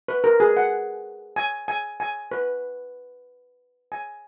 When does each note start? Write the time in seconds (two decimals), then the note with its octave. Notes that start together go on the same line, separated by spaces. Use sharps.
0.08 B4
0.24 A#4
0.40 G#4
0.57 F#5
1.36 G#5
1.68 G#5
2.00 G#5
2.31 B4
3.92 G#5